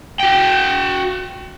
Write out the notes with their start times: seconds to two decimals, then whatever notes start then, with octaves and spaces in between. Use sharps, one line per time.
0.20 F#4 G5